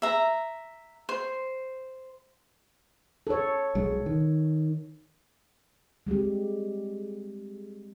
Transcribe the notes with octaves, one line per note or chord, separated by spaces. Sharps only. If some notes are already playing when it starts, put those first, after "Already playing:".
E5 A#5
C5
A4 C#5
B1 G#3
D#3
G3 G#3 C4 G4